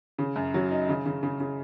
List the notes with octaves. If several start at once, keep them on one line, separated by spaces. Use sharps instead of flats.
C#3
F#2
F#3
D#4
C#3
C#3
C#3
C#3